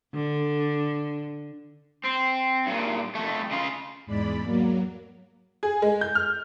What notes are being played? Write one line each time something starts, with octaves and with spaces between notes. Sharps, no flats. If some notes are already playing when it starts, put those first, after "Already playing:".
D3
C4
G2 A#2
F2 A3
C#3 F4
E2 G#2 G#3 D5 B5
F#3 A#3
G#4
G#3
G6
F6